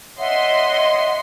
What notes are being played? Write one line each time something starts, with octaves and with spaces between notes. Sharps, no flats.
C#5 D#5 E5 F#5 C6